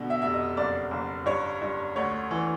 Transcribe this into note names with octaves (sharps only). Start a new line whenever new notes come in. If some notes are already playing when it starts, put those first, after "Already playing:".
Already playing: B2 D3
E5
F1 E5
D#5
F#1 D5
F#1
G2 C#5
G2
D2 C#5
E3